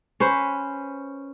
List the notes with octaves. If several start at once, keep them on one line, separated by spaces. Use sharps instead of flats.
C#4 B4 C5